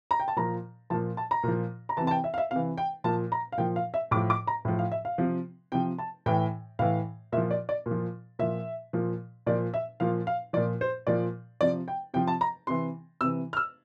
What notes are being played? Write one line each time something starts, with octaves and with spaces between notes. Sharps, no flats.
A#5
G5
A5
A#2 F3 A#5
A#2 F3 A5
A5
A#5
A#2 F3
A#5
C3 E3 A5
A5
G5
E5
F5
E5
C3 E3 F5
G5
A#2 F3 A5
A#5
F5
A#2 F3 G5
F5
E5
A2 F3 D6
D6
A#5
A2 F3
F5
E5
F5
C3 F3
C3 F3 G5
A5
A2 E3 G5
A2 E3 F5
A#2 F3 E5
D5
D5
A#2
F3
A#2 F3 E5
A#2 F3
A#2 F3 D5
E5
A#2 F3 F5
F5
A#2 F3 D5
C5
A#2 F3 D5
C3 F3 D5
G5
C3 F3 G5
A5
A#5
C3 E3 C6
C3 E3 E6
F6
E6